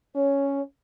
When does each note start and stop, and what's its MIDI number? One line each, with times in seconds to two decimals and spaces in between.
0.15 0.61 61
0.15 0.62 73